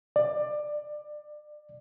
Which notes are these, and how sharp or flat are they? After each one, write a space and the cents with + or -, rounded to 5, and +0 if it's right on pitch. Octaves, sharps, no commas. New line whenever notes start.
D5 +20